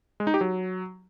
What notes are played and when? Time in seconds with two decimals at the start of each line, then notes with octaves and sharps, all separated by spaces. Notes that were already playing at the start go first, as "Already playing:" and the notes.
0.20 G#3
0.27 D#4
0.34 G4
0.41 F#3